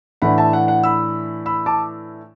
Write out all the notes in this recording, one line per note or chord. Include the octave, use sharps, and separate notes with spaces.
A2 E3 D4 F#5 B5
E5 A5
F#5
F#5
B5 E6
B5 E6
A5 D6